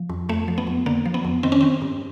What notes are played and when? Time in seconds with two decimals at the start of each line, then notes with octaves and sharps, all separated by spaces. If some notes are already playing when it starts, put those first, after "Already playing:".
Already playing: F3
0.10 F2
0.29 F2 A3
0.48 F3
0.58 B3
0.67 F2
0.86 D3 A#3
1.05 F3
1.14 B3
1.24 F2
1.43 D#3 C4
1.52 C#4
1.61 D#3 C4
1.81 G2